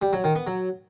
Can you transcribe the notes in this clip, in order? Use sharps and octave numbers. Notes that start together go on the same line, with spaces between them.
G3
F#3
D#3
B3
F#3